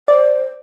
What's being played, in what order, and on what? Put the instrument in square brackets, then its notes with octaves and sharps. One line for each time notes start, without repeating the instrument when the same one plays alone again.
[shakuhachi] C5 [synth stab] D5